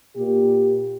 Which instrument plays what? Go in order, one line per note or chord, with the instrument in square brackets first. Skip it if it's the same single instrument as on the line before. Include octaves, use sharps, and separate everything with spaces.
[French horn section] A#2 A#3 G4